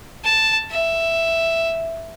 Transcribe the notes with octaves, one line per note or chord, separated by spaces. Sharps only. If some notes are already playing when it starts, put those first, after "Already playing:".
A5
E5